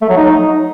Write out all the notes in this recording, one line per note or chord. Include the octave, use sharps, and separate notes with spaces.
A3
F#3
D#4